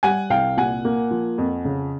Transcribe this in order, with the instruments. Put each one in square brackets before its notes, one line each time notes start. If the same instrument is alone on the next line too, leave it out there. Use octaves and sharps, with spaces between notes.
[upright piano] G3 F#5 G#5
C2 F5 G5
A#2 F#5 G#5
A#3
F3
F2
C#3